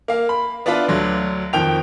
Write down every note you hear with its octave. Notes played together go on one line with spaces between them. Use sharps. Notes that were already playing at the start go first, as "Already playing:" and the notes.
A#3 F5
B5
B3 D4 E4 F4 B4
D2 D3 F#3
F2 D#3 G5 F7